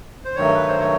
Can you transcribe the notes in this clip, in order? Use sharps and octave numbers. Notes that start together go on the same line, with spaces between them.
C5
G2 D#3 F#3 A3 C#5
B4
C5
C#5